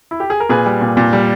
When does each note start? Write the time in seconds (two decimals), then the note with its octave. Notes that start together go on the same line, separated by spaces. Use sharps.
0.11 E4
0.20 G4
0.30 G#4
0.40 A#4
0.49 A#2 G#4 B4
0.66 G3
0.81 A#2
0.97 A#2
1.13 G3